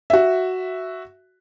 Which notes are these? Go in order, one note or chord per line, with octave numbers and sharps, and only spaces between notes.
F#4 E5